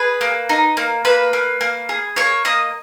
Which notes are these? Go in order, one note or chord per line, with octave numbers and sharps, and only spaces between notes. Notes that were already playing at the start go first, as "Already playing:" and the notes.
Already playing: G#4 B4 B5
A#3
D#4
A#3
A#3 B4 B5
A#3
A#3
G#4
A#3 C#5 C#6
A#3 D#5 D#6